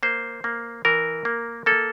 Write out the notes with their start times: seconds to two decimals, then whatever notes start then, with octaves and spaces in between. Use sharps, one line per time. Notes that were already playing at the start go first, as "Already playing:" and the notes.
0.03 A#3 C5
0.44 A#3
0.85 E3 A#4
1.25 A#3
1.66 A#3 A4